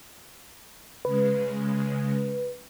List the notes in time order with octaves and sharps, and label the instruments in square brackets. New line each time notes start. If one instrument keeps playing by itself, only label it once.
[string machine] C#3 G#3 [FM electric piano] B4